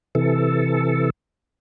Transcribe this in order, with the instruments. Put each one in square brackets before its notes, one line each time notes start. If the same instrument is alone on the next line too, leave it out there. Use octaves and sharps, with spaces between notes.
[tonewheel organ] C3 E3 A4